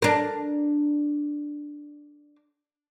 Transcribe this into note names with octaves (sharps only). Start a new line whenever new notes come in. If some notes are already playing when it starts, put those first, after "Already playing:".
D4 A#4